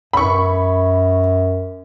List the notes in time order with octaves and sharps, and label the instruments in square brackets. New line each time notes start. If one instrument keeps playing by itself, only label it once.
[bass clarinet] F#2 [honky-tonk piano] B5 C#6